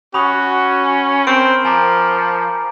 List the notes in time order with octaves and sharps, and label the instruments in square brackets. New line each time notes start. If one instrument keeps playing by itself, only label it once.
[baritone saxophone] C#4 [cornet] F#4 [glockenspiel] B5 D#6
[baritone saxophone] C4 [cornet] A#4 [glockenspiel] D7
[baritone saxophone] F3 [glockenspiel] G#5 A#5 D6